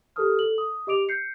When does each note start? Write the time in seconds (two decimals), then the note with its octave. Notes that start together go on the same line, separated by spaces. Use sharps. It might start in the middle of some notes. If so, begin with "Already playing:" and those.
0.16 G4 A4 A#4 A5 D#6 F6
0.39 A4 F#7
0.58 D#6
0.87 G4 D#5 D6 D7 F7
1.09 G6 C7 C#7